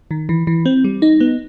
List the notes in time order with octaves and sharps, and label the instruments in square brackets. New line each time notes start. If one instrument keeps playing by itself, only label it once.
[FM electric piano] D#3
E3
E3
C4
G3
D#4
B3